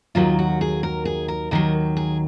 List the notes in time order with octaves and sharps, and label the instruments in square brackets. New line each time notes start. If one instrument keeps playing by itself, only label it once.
[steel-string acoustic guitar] D#2 D#3 F#3 F4
F#4
G#4
A#4
G#4
A#4
D#2 D#3 F#3 A#4
G#4